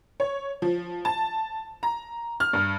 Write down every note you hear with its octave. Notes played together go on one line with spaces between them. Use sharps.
C#5
F3
A5
A#5
F6
G2